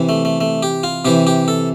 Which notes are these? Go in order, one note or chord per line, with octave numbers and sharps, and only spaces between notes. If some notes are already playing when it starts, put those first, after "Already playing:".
Already playing: C3 E3
A3
A3
A3
G4
F4
C3 E3 G4
G4
A4